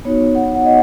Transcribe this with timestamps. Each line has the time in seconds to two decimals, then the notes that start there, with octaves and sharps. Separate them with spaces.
0.05 B3 D#4 F#4 C#5
0.35 F#5
0.55 F#5
0.65 D#5